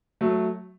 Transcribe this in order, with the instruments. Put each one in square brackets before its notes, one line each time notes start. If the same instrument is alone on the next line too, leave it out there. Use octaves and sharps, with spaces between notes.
[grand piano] F#3 A3